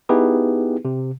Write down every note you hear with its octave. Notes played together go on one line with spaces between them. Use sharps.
B3 D#4 E4 G4 G#4 B4
C3